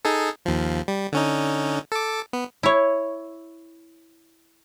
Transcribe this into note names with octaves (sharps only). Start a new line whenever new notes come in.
D#4 G#4 A4
D#2 F3
G3
D3 C#4 D#4
A4 D6
B3
E4 C#5